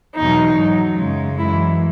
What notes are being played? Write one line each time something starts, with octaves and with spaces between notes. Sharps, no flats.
E2 B2 F#3 D#4
G#2 F#3
F#2 C#3 G#3
F#2 E3 G#3 E4